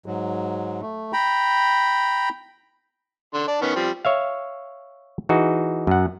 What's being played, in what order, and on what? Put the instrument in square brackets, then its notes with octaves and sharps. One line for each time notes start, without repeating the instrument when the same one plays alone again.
[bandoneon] G#2 F#3
A3
G5 A#5 B5
[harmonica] D3 C6
D5 A5
D#3 B3 C#4
F3 G3 C4
[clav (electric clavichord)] C#5 E5 F5
E3 D#4 F#4 G#4
F#2 F#5